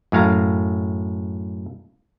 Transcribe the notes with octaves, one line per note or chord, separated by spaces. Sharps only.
F#2 A2 F5 A#5